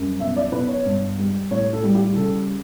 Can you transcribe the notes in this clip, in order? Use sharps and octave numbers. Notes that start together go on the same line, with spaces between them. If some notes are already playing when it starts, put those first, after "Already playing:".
Already playing: F#2 G3
B2 E5
D5
B2 B4
C#5
G2
G3
A2 C#5
A4
G3
G4
C#3 A4